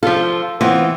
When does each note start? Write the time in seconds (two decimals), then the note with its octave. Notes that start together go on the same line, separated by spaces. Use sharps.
0.03 F3 F4 A4
0.61 E3 B3 C4 F4